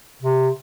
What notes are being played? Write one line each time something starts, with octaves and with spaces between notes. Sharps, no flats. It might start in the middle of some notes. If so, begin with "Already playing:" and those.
C3